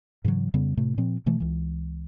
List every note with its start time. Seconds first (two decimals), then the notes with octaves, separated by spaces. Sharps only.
0.24 G#2 C#3 E3 F#3
0.54 F2 C#3 G3 B3
0.77 A2 C3 A3
0.98 A#2 F3 C4
1.26 B2 E3 A3
1.40 C#2 E3